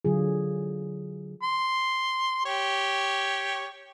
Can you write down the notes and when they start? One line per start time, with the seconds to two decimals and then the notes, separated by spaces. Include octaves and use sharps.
0.05 D3 F#3 F4 G#4
1.43 C6
2.45 G4 C#5